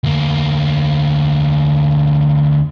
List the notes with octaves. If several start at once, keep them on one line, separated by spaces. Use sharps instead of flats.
D2 A#3